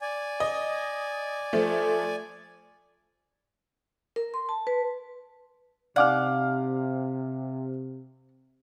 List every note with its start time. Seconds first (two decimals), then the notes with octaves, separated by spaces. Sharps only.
0.01 D5 G#5
0.40 D#5
1.53 F3 A3
4.16 A#4
4.34 C6
4.49 A5
4.67 B4
5.96 C3 D#4 D5 F5 F#5 D6 F6